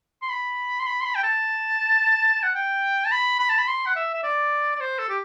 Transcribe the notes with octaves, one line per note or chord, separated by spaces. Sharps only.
C6
B5
C6
B5
C6
B5
G5
A5
F#5
G5
A5
B5
B5
A5
B5
C6
F#5
E5
E5
D5
D5
C5
A4
G4